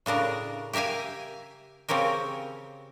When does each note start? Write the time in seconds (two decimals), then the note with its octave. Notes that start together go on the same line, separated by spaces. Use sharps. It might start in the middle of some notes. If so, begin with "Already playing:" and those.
0.06 A2 C#3 D4 A#4
0.73 G4 A#4 E5 F5 G#5
1.89 C#3 C4 C#4 G4 A#4